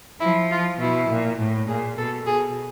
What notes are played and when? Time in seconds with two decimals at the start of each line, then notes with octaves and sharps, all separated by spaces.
0.20 F3 E4
0.51 F4
0.80 B2 E4
1.10 A#2
1.39 A2
1.68 A#2 G#4
1.98 B2 A4
2.27 B2 G#4